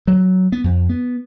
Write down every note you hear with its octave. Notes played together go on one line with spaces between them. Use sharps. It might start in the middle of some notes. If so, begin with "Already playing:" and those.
F#3
B3
F2
B3